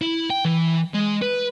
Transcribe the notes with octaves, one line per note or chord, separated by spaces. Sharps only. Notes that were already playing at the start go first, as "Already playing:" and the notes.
E4
G5
E3
G#3
B4